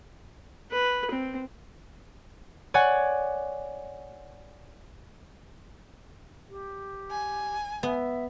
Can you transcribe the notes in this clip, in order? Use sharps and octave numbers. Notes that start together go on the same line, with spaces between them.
B4
C4
C#5 D5 F#5 G#5
G4
G#5
B3 E5